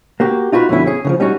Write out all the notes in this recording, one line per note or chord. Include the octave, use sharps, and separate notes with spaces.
A#3 F#4 G4
D#4 F4 F#4 G#4 B4
F2 B2 D3 C#4 E4
C#4 G#4
C#3 E3 F3
G3 C#4 D#4 F#4